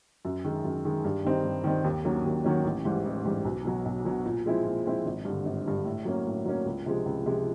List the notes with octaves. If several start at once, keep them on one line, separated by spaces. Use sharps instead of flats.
F#2
D#3 G#3
F#2
D#3 G#3
G2
D#3 G3 C4 D#4
G2
D#3 G3 C4 D#4
D#2
D#3 F#3 A#3 C#4
D#2
D#3 F#3 A#3 C#4
A1
G#2 E3 G3
A1
G#2 E3 G3
B1
B2 F#3
B1
B2 F#3
A#2
F3 G#3 C4 E4
A#2
F3 G#3 C4 E4
G#1
G2 D3
G#1
G2 D3
A2
F#3 A#3 C#4
A2
F#3 A#3 C#4
C#2
C3 F3 G#3
C#2
C3 F3 G#3